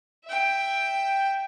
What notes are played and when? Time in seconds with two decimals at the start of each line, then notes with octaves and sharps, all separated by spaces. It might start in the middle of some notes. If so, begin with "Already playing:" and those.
0.25 E5 G5